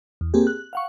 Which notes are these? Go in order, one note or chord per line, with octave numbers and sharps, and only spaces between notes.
E2
A#3 C4 G4 G#4
F#6
F5 F#5 C#6